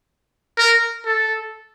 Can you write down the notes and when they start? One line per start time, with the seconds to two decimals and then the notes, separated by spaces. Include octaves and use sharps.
0.58 A#4
1.05 A4